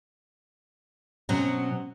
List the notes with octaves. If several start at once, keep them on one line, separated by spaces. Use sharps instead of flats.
B2 F#3 C4 C#4